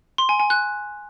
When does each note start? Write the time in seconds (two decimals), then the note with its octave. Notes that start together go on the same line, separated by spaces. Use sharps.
0.18 C6
0.29 G#5
0.40 G#5
0.50 F#6